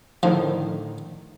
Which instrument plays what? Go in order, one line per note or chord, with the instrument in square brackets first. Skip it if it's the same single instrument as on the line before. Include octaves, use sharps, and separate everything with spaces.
[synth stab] A2 D3 D#3 [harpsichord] F3